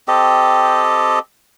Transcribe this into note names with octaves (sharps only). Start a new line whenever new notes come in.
C4 G4 A4 D#5